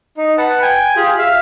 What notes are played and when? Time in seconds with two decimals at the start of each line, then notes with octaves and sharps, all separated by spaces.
0.17 D#4
0.38 B4 F#5 A5
0.62 G5 G#5
0.96 F4 G4 G#4
1.18 E5 F5